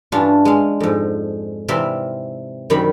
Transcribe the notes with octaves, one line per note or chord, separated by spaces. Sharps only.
G2 E3 C#4 D4 F4
G#3 F5
F2 G#2
C3 E3 D5 E5 F5 C6
F#2 C3 D#3 G3 B5